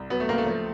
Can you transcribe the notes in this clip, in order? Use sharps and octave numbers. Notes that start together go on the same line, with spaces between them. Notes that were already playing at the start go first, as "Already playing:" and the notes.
Already playing: C2
F#3 B3
A3
C#2 A#3
A3
F3